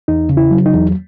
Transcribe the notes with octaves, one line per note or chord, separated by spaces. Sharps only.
E2 D#4
C#3
E4
F#3
D#4
E2